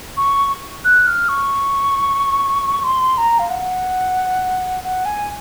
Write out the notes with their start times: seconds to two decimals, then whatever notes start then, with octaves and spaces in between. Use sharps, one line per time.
0.17 C#6
0.85 F#6
1.07 F6
1.29 C#6
2.84 C6
3.18 A#5
3.39 F5
3.50 F#5
4.84 F#5
5.05 G#5